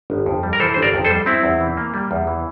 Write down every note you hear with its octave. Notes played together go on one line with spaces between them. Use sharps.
G1
F2
G3
A#4
E3 A4 C5
G1 C5
A#4 D5
F2
A4 C5
G3
G3 C4 E4
E2
E3
A#3
G3
E2
E3